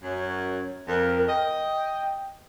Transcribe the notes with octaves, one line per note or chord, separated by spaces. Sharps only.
F#2 C#5
F2 A#4
D#5 G5